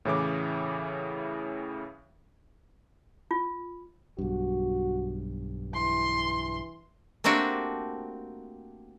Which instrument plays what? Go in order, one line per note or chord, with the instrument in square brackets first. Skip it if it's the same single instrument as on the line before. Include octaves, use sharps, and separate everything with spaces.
[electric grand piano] A2 C#3 E3 D6
[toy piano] F4
[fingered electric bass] B1 G2 [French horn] F#4
[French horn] E3 [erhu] C6
[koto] A3 A#3 C4 D4 F#4 G4